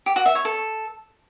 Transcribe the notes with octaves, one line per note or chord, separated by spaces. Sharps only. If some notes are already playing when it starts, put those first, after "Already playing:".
G4
F#4
E5
C#5
A4